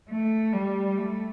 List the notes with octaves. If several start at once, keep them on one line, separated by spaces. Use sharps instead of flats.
A3
G3
A3